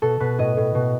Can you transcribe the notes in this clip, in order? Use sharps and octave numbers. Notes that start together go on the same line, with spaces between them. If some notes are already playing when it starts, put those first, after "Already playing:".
B2 A4
B2 B4
A2 D#5
A2
B2